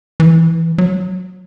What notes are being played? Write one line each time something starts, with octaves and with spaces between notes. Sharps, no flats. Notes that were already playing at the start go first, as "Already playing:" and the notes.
E3
F#3